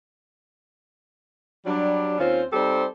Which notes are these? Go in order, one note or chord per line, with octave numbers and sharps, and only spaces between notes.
F#3 G3 D4
D#2 D#3 C4 C#4 F4 C5
G3 C4 D#4 G4 A4 C5